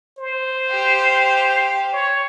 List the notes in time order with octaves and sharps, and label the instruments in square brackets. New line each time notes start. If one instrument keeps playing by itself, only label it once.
[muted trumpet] C5
[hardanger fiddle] G4 F5
[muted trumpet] C#5